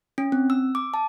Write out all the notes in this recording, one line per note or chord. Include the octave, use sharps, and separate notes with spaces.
C#4
C4
E6
D6
A5